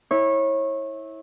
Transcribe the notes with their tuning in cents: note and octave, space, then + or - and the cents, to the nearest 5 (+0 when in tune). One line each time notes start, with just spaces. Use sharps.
E4 -20 C#5 -25